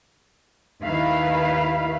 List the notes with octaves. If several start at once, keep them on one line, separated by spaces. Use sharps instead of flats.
D#2 D#3 E4 B4 F5